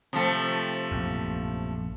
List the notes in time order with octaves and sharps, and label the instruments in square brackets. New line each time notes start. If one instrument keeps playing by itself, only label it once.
[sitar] C3 F3 A3
[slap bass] A#1 F#2